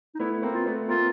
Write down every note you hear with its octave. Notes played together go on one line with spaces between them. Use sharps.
D#4
A3 B3 E4
A#3 C4
F4
A3 B3
A#3 C4 F4